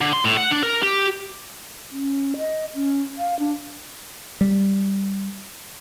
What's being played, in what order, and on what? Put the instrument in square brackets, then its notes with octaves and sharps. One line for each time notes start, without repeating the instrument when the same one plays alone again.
[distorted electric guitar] D3
C6
A2
F#5
D4
A#4
G4
[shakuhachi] C#4
D#5
C#4
F5
D4
[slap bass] G3